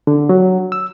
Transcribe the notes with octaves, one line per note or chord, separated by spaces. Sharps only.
D3
F#3
E6